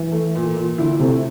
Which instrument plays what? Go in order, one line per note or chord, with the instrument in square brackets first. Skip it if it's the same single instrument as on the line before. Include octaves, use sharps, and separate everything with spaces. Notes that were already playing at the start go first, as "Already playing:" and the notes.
Already playing: [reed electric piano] E3
[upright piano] A3
A#2
A#2
[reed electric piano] D3 [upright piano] E4
[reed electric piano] C3 [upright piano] A3